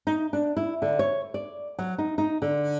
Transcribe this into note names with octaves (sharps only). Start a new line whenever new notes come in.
D#4
D4
E4
D3
C#5
D5
F#3
D#4
D#4
D3